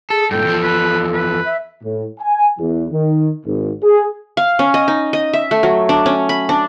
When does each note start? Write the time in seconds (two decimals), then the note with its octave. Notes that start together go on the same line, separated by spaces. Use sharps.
0.10 G#4 A4
0.31 G2 A#2 A4 G5
0.45 E2 F3
0.62 B4
1.13 B4
1.45 E5
1.83 A2
2.20 G#5
2.59 E2
2.91 D#3
3.46 G#1
3.83 G#4
4.37 F5
4.59 C#4
4.74 D#5
4.88 D#4
5.13 D#5
5.33 E5
5.51 A3
5.63 F#3
5.89 D4
6.06 C#4
6.29 B5
6.49 D4